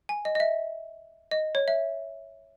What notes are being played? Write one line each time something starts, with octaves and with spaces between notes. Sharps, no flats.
G#5
D#5
D#5
E5
D#5
C#5
E5